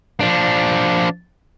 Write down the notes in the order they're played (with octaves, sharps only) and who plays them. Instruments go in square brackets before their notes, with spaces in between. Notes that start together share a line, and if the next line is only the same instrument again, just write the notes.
[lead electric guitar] F3 D4